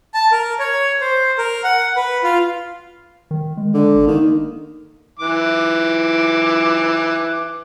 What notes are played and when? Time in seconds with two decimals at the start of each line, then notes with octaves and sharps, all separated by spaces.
0.14 A5
0.32 A#4
0.59 C#5
1.01 C5
1.38 A#4
1.64 F#5
1.96 B4
2.24 F4
3.31 D#3
3.57 G#3
3.74 D3
3.95 G#1
4.07 D#3 A#3
5.20 E3 D6